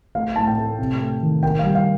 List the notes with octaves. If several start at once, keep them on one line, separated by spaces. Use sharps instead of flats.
A3 F5
A2 A5
G5
A3
C3
A3
D#3
A#3 G5
G3 F5
F5